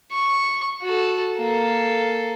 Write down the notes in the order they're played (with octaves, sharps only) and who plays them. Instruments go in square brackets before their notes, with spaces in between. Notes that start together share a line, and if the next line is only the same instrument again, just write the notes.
[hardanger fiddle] C#6
F#4 A4
A#3 A4